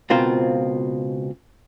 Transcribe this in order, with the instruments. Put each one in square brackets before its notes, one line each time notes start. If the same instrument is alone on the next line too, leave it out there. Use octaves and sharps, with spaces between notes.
[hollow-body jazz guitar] C#2 B2 C4 F4 A#4 C5